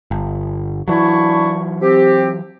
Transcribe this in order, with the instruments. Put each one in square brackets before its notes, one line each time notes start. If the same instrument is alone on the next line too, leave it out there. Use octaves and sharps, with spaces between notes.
[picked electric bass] G1
[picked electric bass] E3 F#3 [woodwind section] D4 E4 C#6
[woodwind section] C4 G4